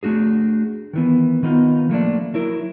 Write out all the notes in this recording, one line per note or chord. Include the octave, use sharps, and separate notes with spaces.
A3 D4 F#4 G#4
D#3 E3 B3
D#3 B3 D#4 F4
F3 A3 A#3 D4
F#3 E4 A#4